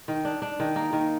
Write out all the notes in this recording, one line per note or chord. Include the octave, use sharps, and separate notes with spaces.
D#3
D4
D4
D#3
A#3
D#3